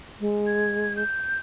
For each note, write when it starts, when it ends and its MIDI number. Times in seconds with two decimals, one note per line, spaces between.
0.20 1.03 56
0.47 0.92 92
0.96 1.38 91